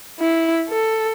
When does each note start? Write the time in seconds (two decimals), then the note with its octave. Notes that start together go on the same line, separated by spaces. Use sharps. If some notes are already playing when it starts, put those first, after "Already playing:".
0.20 E4
0.69 A4